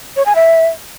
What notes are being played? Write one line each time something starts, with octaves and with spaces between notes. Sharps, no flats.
C#5
G#5
E5